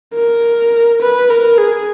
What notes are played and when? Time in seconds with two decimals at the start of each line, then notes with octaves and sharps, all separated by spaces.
0.15 A#4
1.02 B4
1.30 A#4
1.58 G#4